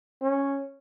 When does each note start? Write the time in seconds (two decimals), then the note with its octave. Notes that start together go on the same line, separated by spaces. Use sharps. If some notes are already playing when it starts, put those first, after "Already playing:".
0.22 C#4